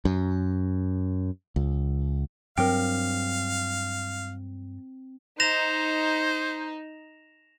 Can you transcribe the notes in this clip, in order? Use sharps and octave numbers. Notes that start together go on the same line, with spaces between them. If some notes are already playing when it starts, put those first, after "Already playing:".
F#2
C#2
G2 F#3 C4 D4 A#4 F5 G5
D#4 C5 A#6 E7 F7